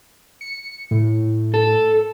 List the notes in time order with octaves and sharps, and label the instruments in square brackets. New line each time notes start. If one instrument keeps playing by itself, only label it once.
[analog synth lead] C#7
A2
[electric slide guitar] A4